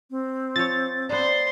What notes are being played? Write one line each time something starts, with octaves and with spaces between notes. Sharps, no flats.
C4
F3 C#5 A6
B3 D4 C5 C6